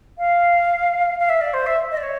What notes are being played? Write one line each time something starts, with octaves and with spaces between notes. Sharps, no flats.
F5
F5
E5
D5
C5
E5
D#5
D5
C#5